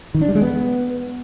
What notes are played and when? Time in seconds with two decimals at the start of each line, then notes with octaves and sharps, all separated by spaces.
0.14 D#3
0.21 D4
0.28 G3
0.35 G#3
0.42 B3